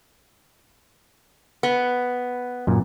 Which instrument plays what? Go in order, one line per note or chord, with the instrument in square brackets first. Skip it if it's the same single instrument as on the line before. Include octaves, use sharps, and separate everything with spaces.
[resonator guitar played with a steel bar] B3
[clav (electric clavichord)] F#2 A#2